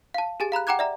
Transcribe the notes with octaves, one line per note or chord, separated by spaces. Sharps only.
F5 A5
G4 G#4 G#5 A6
F5 A#5 B5 F#6
F#5 G5 A#5 D6 F#6 G#6
D5 E5 A#5